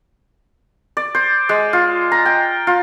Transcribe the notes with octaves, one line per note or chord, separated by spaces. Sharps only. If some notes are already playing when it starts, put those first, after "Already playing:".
D5
C5
G#3
F4
A#5
G5
F4